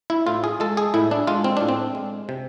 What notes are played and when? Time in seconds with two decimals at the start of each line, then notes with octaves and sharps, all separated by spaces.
0.10 E4
0.27 A2 F4
0.44 G#4
0.60 G#3 A4
0.77 G#4
0.94 A2 E4
1.11 D4
1.27 G#3 F4
1.44 C4
1.57 A2 D4
1.69 C4
1.95 G#3
2.29 C3